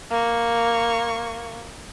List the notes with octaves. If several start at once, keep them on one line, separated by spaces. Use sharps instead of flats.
A#3 C#6